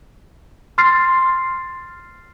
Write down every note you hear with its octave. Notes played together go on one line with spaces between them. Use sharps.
C6 F6 A6 C7